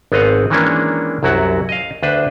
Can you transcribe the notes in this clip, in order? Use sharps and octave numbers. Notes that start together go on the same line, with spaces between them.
G#1 B3 C4 D#5 F5 F#5
D#3 E3 G#3 A#3 C#4 D4
C2 F#2 F#3 E4 F#4 F#5
D#5 F5
D2 D4 B4 C5